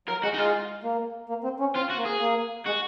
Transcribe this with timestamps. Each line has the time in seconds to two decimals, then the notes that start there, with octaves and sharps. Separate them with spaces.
0.08 F#3 A#4
0.23 G#3 F#4
0.34 D#4
0.38 G#3 F4
0.84 A#3
1.29 A#3
1.44 C4
1.60 C#4
1.75 C4 F4
1.90 F#4
1.97 A#3
2.05 G#4
2.21 A#3
2.66 G#3 F#4